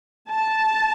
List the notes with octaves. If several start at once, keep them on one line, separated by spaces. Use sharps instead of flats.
A5